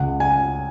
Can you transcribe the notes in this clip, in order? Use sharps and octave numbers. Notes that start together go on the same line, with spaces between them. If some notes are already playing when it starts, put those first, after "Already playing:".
Already playing: C#2 C#3 F#5
G#5